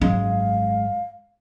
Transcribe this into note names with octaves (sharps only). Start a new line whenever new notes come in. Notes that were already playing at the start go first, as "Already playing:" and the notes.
G#1 F#2 G#3 C#4 F5